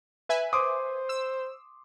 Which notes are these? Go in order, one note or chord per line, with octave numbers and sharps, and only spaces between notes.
B4 E5 G#5
C5 C6 D6 D#6
E6